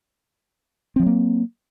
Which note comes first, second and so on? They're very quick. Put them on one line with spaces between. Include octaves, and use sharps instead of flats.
C4 F3 F#3 A#3